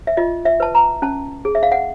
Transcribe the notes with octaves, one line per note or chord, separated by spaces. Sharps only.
E5
F4 D#5
E5
B4 A5
A#5
C#4 A5
G#4
E5
F5
F#5